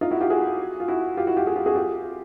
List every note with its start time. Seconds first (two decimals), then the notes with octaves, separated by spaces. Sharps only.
0.01 D#4 F4
0.11 E4 F#4
0.21 F4 G4
0.30 F#4 G#4
0.80 F4
0.88 E4 F#4
1.17 F4 G4
1.27 E4 F#4
1.37 F4 G4
1.46 F#4 G#4
1.56 F4 G4
1.66 F#4 G#4
1.75 F4 G4